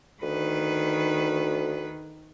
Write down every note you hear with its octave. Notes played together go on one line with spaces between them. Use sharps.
D2 D#3 B4